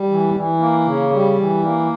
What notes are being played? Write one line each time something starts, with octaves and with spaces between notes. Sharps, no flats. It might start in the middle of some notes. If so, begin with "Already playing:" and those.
Already playing: G3
E3
E3
A#3
C#3
G3
E3
A#3